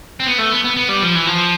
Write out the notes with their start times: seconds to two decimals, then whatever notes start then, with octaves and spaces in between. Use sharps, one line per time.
0.20 C4
0.27 B3
0.39 A3
0.52 B3
0.64 B3
0.77 B3
0.89 G3
1.02 F3
1.15 E3
1.27 F3